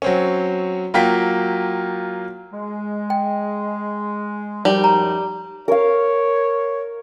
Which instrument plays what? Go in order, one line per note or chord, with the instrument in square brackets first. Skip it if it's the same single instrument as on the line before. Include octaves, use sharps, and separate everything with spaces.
[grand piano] F#3 C4 C#4
F#3 A#3 F4 G5 B6
[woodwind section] G#3
[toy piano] G5
[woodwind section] F#2 F3 D#4 [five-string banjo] G3
[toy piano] A#5
[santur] A#4 F5 [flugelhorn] C#5